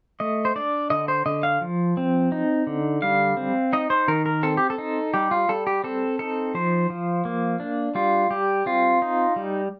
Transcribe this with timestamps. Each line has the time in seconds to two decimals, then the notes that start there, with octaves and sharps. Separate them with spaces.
0.20 A3 D#5
0.45 C5
0.56 D4 D5
0.90 D3 D#5
1.08 C5
1.26 D3 D#5
1.43 F5
1.61 F3
1.97 C4
2.32 D#4
2.67 D3
3.02 G3 F5
3.37 C4
3.73 D#4 D#5
3.90 C5
4.08 D#3 A#4
4.26 A#4
4.43 C4 A4
4.57 G4
4.70 A4
4.78 D#4
5.14 G3 G4
5.31 F4
5.49 G3 A4
5.67 G4
5.84 C4 A4
6.19 D#4 A4
6.54 F3 C5
6.90 F3
7.25 A#3
7.60 D4
7.95 G3 F4
8.30 G3 G4
8.66 C4 F4
9.02 D#4
9.36 G3